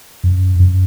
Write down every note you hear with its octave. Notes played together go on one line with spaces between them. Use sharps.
F#2
F#2